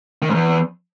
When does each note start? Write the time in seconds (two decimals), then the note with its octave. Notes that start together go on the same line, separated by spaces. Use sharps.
0.22 D#3
0.28 G#2
0.34 E2